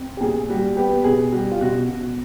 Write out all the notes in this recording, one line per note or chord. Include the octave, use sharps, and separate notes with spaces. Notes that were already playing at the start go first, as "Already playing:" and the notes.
Already playing: C4
G4
A#2 G#4
G3 F#4
B3 G4
B2 G#4
G3 F#4
F4
B2 F#4
B2